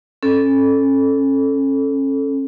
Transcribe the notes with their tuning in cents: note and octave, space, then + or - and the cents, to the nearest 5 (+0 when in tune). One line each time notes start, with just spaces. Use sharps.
C#4 -30 A4 -5